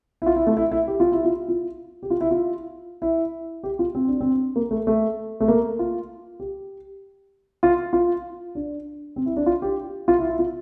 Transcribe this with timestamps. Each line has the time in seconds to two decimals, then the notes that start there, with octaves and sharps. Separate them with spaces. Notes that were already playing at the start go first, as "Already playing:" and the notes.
0.22 E4
0.26 F4
0.36 E4
0.47 A3
0.57 E4
0.72 E4
0.87 G4
1.00 F4
1.12 E4
1.25 F4
1.49 F4
2.03 G4
2.10 F4
2.21 E4
2.31 F4
3.02 E4
3.64 G4
3.79 F4
3.95 C4
4.07 D4
4.21 C4
4.56 A#3
4.71 A3
4.87 A3
5.40 A3
5.48 A#3
5.79 F4
6.40 G4
7.63 F4
7.93 F4
8.55 D4
9.16 C4
9.26 E4
9.36 D4
9.46 F4
9.62 G4
10.08 F4
10.19 E4
10.29 E4
10.39 F4